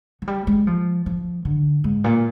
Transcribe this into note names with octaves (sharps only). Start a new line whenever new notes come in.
F#3
G3
G#3
F3
F3
D3
G#2
A#2